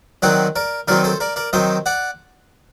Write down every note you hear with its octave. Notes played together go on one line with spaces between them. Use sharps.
D#3 F#3 C4 D#4 D5 F#5
A#4 D5
D#3 F#3 C4 D#4 A#4 D5
A4 C5
A#4 D5
A#4 D5
D#3 F#3 C4 D#4 C5 D#5
D5 F#5